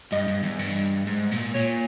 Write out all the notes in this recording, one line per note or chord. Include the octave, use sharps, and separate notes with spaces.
G2 D#5
G2
E2
G2
G#2
A#2
A#2 C#5